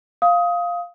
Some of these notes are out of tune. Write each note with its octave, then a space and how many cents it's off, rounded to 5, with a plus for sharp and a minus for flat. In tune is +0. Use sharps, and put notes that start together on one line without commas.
F5 +0 D#6 +20